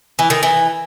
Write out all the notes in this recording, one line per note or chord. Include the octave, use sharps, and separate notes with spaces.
E3
D#3
E3